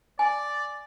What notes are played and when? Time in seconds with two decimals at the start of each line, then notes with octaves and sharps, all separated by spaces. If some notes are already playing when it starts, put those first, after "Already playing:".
0.19 D5 G#5